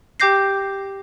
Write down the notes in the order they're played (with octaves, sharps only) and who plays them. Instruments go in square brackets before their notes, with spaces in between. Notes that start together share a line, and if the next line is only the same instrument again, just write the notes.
[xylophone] G4 G5 D6 G6 A#6 C7